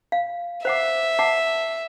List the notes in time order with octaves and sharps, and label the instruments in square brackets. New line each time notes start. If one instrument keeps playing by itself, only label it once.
[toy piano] F5
[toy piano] C5 F#5 D6 [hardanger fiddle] E5
[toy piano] F#5 A5 D6